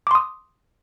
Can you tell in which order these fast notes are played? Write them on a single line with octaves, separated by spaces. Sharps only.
D6 C6 D#6